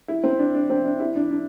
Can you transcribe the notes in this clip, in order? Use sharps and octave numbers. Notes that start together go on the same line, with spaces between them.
E4
C4
D4
D4
C4
D4
E4
D4
D4